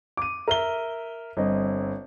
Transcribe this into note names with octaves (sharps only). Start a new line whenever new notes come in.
D6 D#7
A#4 E5 G7
G1 C4 D#5